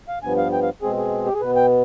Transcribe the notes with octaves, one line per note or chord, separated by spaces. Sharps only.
F5
G2 F3 B3 G#5
F5
G5
F5
B2 G#3 C4 G#4
G#4
G4
G#4
B2 B3 B4
G5